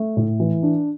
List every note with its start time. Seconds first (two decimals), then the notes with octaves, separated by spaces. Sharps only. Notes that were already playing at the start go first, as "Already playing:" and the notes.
Already playing: A3
0.17 A2
0.40 E3
0.63 D4